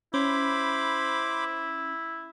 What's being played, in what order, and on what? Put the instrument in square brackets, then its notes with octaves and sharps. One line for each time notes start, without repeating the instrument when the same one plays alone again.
[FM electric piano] C#4 [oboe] E4 [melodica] C5 B5 D6